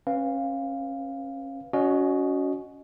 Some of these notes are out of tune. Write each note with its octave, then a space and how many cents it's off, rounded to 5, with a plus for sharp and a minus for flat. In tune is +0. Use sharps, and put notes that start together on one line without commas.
C#4 -30 B4 +0 F5 +0
C#4 +25 F#4 +0 D#5 -10